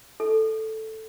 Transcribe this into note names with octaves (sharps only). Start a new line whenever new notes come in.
A4